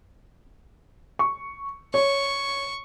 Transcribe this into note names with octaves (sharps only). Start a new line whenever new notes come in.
C#6
C#5 C#6